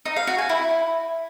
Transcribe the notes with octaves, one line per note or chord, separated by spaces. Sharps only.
D#4
F5
F#4
G#5
E4